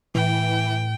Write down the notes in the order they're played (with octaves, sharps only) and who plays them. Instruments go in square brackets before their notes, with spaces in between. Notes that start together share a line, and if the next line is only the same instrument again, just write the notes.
[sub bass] A2 [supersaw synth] E3 [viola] G5